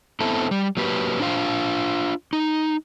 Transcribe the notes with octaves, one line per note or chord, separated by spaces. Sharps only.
B3 C4 E4 A4
G3
F#3 A#3 G4 B4
D4 F4 C5 F5 G5
D#4